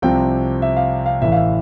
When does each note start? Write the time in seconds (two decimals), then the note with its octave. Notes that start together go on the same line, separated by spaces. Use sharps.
0.02 C2 C3 F3 C4 G5
0.62 E5
0.77 F5
1.06 F5
1.22 A1 A2 E3 E5
1.32 F5
1.36 E5